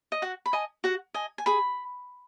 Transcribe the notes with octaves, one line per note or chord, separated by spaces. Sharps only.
D#5
F#4 F#5
B5
D#5 G#5
F#4 F#5
D#5 G#5
G#5
G#4 B5